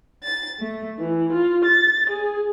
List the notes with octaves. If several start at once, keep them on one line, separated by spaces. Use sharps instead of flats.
A6
A3
E3
F4
A6
G#4